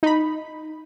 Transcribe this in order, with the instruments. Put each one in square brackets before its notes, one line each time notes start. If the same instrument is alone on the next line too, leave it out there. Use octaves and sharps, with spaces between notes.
[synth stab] D#4 B5